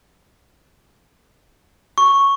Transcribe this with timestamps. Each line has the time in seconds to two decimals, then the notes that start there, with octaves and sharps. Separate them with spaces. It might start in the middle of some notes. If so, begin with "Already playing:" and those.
1.98 C#6